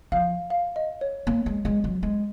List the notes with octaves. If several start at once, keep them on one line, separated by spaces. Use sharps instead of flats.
F3 F5
F5
D#5
C#5
A#3
G#3
G#3
F#3
G#3